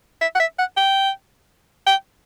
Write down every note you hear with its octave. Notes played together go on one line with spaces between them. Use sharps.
E5
F#5
E5
F#5
G5
G5